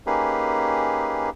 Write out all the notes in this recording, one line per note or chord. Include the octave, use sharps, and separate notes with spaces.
A#3 C#4 D#4 G4 G#4 B4